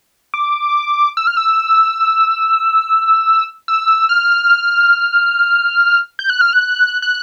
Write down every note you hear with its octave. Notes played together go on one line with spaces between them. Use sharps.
D6
E6
F6
E6
E6
F6
G6
F#6
F6
F#6
F#6